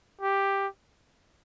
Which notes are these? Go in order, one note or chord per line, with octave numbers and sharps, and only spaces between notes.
G4